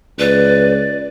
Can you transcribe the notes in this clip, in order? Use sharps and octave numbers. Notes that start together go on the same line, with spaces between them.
C#2 B4 D5